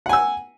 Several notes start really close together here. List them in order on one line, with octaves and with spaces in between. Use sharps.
F#5 G#5 E6